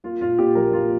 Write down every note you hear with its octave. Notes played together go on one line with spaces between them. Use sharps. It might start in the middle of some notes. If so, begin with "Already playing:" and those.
A#3 F4
A#2 F4
A#2 G4
A#1 A#4
A#3 F4